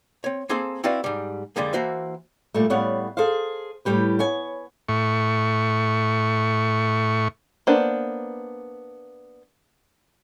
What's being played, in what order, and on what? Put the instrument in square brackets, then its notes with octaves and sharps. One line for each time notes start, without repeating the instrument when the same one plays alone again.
[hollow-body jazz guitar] C4 C#5
A#3 C4 G#4 A4 C5 C6
C4 E4 F#4 B4 D5 F5
G#2 G3
F2 D3 G3 G#3 A#3
E3 A#3 F#4 C5 E5
[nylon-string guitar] A#2 G3 A3
A2 G3 B3 C#5 F5 F#5
G#4 A4 C5 F5
A2 G3 G4 B4
B3 C#5 G#5
[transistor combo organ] A2 C#6
[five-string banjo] A#3 B3 D4 C5